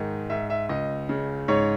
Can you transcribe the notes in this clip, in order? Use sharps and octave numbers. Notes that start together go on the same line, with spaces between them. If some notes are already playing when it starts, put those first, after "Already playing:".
Already playing: G#2 D#3
G#2 E5
E5
C#2 D#5
C#3
G#2 C#5